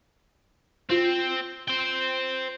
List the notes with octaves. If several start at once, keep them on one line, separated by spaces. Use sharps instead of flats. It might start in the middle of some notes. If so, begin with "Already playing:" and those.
C4 F4
C5 G5